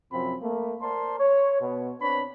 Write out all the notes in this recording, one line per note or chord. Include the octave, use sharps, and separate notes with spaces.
F#2 C3 F3 C4 B5
A3 A#3
A#4 C5 D5 A5 C6
C#5
B2
C4 D4 B4 C#5 B5